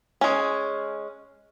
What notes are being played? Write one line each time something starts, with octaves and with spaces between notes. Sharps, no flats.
G#3 C#4